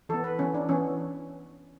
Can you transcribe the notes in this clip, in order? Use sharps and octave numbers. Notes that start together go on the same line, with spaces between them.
E3 B3 A4
B4
E3 B3 C#4
D4
E3 B3 C#4